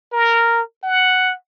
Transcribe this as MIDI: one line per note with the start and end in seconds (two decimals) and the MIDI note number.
0.13 0.61 70
0.83 1.34 78